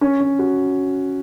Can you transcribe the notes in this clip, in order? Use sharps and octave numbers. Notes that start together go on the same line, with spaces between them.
C#4
C#4
F#4